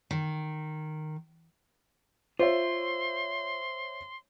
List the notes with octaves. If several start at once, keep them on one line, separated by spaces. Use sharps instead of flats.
D#3
F4 C5 C#5 E5 C6